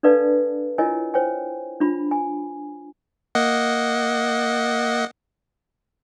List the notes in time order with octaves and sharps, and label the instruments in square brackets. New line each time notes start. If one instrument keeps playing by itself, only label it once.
[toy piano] D4 A4 B4 D5 F5 A5
E4 F4 A#4 C#5 D#5 G#5
C5 C#5 G5 G#5
D4 F4 B5
G#5
[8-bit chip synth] A#3 D#5 F#5